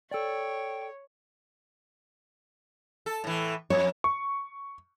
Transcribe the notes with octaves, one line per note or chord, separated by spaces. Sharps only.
A4 C#5 D5 G5
A4
A2 E3
F2 C#5
C#6